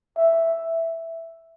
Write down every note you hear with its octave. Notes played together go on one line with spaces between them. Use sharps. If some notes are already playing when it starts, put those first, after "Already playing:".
E5